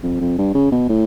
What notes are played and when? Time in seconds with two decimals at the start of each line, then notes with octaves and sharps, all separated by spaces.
0.03 F2
0.20 F2
0.38 G2
0.54 C#3
0.72 B2
0.89 A2